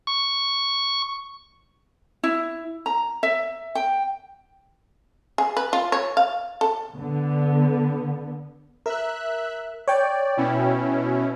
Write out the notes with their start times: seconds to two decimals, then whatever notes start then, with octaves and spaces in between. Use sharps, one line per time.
0.07 C#6
2.23 E4
2.86 A#5
3.23 E5
3.75 G5
5.38 G#4
5.57 B4
5.73 F4
5.92 C#5
6.17 F5
6.61 A4
6.94 D3 B3
8.86 A#4 E5 F#6
9.88 C#5 D5 G5
10.37 B2 C#4 E4